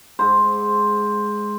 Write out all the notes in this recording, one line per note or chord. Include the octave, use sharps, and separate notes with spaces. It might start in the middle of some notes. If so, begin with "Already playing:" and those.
G#2 C5